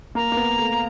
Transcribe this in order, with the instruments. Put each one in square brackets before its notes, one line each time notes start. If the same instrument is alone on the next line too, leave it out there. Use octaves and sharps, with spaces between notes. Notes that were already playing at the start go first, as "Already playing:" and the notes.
[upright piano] A#3 [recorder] A#5
[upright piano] A#3
B3
A3